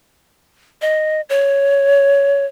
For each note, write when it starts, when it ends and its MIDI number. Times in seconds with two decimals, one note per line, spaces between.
0.82 1.21 75
1.29 2.45 73